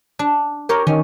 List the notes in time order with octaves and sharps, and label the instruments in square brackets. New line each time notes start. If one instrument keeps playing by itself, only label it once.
[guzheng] D4
[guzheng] G4 C#5 [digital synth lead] A#4
[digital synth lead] D#3 [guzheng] C#4